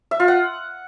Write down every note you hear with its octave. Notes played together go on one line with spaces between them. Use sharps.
E5
F4
F#5